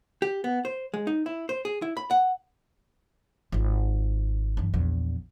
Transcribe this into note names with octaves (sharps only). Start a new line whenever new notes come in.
G4
B3
C5
G#3
D#4
E4
C5
G#4
E4
B5
F#5
G#1 F4
G2 E3
A#1 E2